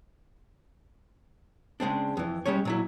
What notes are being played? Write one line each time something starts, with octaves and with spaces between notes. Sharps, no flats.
C#3 G#3 C4 D4
F2 E3
G3 G#3 C#4 C#5
A#2 F#3 E4